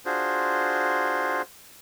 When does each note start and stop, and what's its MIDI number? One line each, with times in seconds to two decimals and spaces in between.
0.05 1.42 62
0.05 1.42 65
0.05 1.42 66
0.05 1.42 68
0.05 1.42 72